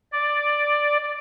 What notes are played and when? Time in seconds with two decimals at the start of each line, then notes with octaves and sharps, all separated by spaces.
0.13 D5